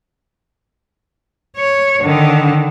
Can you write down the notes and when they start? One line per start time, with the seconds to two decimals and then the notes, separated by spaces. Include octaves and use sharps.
1.57 C#5
2.02 D3 D#3